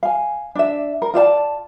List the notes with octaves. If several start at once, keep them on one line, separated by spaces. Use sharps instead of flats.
F5 G#5
D4 E5
A#4
F4 D5 E5 A5